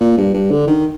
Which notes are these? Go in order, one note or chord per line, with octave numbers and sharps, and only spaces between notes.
A#2
G2
G2
D3
D#3